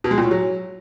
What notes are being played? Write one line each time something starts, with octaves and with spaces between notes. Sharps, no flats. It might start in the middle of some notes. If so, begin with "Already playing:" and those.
B2
G#3
A#2
A2
F#3